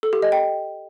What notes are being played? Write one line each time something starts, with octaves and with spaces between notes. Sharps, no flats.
A4
G4
D#5
G5